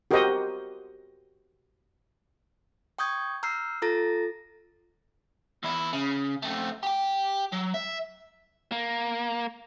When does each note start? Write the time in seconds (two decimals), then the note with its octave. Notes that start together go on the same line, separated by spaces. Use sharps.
0.11 F#4 G4 A#4 C5 D#5
2.98 G5 C#6 D#6 G6 G#6
3.43 A#5 E6 F6 G6 C7
3.82 F4 A4 A#5 A6 A#6
5.63 E2 E4
5.93 C#3
6.42 A3 C4
6.83 G4 G5
7.52 F#3
7.74 E5
8.72 A#3